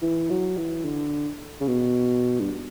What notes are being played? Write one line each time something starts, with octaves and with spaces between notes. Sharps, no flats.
E3
F#3
E3
D3
C#3
B2
G2